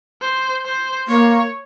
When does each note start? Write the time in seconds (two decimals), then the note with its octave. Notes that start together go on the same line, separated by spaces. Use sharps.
0.21 C5
0.65 C5
1.08 A#3 C#5